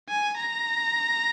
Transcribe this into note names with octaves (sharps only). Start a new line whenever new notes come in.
G#5
A#5